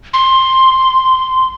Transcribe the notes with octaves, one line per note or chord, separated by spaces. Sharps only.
C6